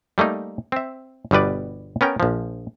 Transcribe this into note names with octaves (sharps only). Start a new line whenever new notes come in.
G3 A3 A#3 D#4
C4 E5
G1 B2 G3 B4 D5
B3 C#4 A#4 G5
A#1 F3